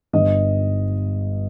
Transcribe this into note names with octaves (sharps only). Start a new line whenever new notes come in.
G1 G2 G3 D#5